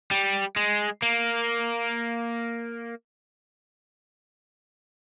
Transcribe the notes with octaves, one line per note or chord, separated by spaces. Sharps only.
G3
G#3
A#3